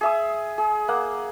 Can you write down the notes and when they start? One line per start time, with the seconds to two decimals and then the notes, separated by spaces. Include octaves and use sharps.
0.01 G#4 E5 D#6
0.58 G#4
0.88 A#3 F#5